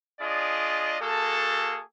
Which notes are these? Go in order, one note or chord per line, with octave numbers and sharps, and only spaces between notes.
D4 F4 G#4 D5 D#5
A#3 F#4 G#4 A4